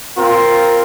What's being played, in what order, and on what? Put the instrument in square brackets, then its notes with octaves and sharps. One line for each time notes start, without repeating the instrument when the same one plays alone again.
[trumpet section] C4 F4 A#4